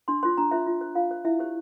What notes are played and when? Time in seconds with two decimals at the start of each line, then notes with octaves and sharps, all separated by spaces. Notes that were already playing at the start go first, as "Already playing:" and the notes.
0.08 D4 C6
0.23 F4 C5 C6
0.38 D4 A#5
0.51 F4 C5 E5
0.67 F4
0.81 C5
0.95 F4 F5
1.11 C5
1.25 E4 E5
1.39 G4 C5